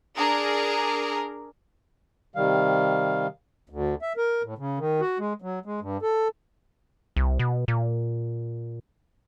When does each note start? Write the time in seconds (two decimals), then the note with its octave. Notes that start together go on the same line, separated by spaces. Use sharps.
0.16 D4 G#4 A#4
2.36 C3 D#3 G3 F5
3.70 D2
4.02 E5
4.17 A#4
4.43 A2
4.58 C#3
4.79 D#3
5.01 F#4
5.19 G#3
5.42 F#3
5.66 G#3
5.81 G2
6.02 A4
7.16 C2
7.39 B2
7.68 A#2